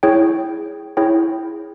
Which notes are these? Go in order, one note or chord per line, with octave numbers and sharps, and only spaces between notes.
E4 G#4 C#5 G5
E4 G#4 C#5 G5